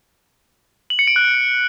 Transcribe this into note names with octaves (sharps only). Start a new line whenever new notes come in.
F#7
C#7
D7
F#6